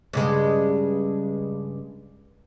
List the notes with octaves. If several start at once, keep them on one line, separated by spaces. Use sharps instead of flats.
G2 C#3 G#3